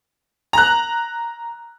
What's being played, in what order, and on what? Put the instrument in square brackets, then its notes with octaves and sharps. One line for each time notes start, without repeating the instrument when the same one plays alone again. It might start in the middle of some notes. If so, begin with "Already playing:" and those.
[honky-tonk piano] A#5 F#6